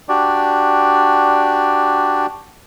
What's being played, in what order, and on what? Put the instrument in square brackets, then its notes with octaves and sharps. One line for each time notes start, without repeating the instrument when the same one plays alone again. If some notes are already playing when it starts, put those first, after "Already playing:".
[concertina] D4 F#4 G4 D5